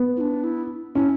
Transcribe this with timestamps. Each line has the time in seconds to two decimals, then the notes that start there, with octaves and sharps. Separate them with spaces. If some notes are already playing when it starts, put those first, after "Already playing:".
Already playing: B3
0.17 E4
0.21 D4
0.44 E4
0.95 C#4 E4